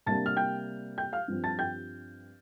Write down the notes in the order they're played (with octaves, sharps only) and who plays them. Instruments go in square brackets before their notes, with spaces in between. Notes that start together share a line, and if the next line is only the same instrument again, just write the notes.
[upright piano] C3 G3 A#3 D4 A5 A6
F6
G5 G6
G5 G6
F5 F6
G2 F3 C4
A5 A6
G5 G6